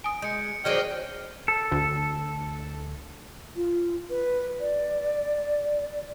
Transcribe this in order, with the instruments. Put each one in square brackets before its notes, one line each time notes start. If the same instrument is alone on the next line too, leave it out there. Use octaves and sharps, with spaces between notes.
[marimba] G#5 D#6 [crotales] D7
[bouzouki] G#3 [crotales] G6 C#7
[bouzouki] D#3 F#3 D5 [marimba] G#4 C5 [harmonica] D#5 G5 F6
[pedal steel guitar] A4
[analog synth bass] D2
[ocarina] F4
B4
D5